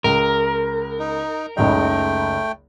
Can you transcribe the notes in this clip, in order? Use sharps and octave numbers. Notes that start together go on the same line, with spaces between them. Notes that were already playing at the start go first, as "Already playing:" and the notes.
C#2 A#4
D#4
F#1 C#2 A3 D#4 G5